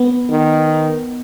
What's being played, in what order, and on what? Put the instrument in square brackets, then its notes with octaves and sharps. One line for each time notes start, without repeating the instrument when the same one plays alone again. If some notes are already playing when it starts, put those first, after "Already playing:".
Already playing: [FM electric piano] B3
[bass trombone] D#3